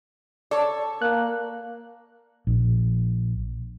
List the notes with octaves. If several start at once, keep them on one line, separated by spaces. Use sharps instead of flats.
A4 C#5 D5
A#3 F#6
A#1